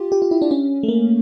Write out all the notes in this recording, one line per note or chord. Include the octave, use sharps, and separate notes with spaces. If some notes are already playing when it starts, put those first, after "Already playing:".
Already playing: F4 G4
G4
F4
E4
D4
C#4
A3
A#3